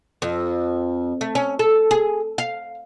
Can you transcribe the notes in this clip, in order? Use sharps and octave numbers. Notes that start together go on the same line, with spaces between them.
F2
A3
C#4
A4
G#4
F5